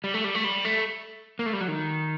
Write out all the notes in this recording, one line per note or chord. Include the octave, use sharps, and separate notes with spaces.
G3
A3
G3
A3
G3
A3
A#3
A3
G3
F#3
D#3